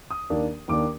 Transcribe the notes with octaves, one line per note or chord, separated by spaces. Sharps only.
D#6
D#2 D#3 A#3 D4
D#2 D#3 A#3 D4 D6